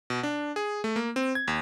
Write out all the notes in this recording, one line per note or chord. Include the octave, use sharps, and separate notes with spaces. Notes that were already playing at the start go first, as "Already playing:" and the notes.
B2
D4
G#4
A3
A#3
C4
G#6
D#2